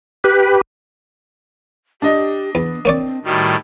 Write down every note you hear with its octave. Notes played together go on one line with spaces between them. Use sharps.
G4 B4
D4 G4 D#5
E2 B3
A#3 C4 C#5 D5
A2 D#3 G3 F#4